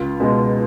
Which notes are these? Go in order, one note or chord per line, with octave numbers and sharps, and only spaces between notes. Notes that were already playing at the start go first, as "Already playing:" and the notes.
Already playing: C#2 F4
B2 G#3